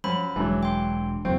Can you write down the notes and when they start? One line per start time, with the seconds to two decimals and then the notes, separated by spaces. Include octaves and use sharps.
0.04 F#2 F3 F#3 B5
0.36 E1 E3 F#3 G#3 D4
0.63 G5 C6
1.25 E2 A2 C3 F#3 A#3 C4 F#4